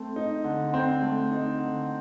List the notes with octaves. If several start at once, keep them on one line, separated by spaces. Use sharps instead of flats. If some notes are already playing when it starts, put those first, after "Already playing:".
Already playing: A3 C4
D#4
D3
C4
A3
D#4
D3